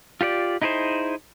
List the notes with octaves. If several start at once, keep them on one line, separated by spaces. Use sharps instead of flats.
F4 G4 C#5 D5
D#4 E4 G#4 A#4 C5